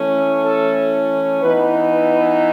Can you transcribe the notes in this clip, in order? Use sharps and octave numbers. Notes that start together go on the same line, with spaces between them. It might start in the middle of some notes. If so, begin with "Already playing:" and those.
Already playing: E3 A3 C#4
A4
E3 B3 D#4 B4
B4